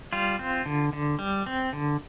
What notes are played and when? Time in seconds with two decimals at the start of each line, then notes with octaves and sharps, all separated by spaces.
0.13 G3 F4
0.39 C4
0.66 D3
0.93 D3
1.19 G3
1.46 C4
1.73 D3